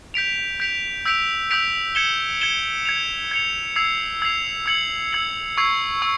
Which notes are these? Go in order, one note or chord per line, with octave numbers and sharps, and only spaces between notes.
G6 B6 D7 F7
G6 B6 D7 F7
E6 G6 B6 D7 F7
E6 G6 B6 D7 F7
G#6 C#7 E7 G7
G#6 C#7 E7 G7
G#6 C#7 F7
G#6 C#7 F7
E6 G#6 C7 F7
E6 G#6 C7 F7
E6 G#6 C#7 F#7
E6 G#6 C#7 F#7
C#6 E6 G#6 C7
C#6 E6